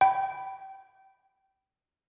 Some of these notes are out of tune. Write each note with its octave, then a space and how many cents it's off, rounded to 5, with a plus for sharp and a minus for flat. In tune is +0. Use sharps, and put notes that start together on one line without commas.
G5 -25 B5 +0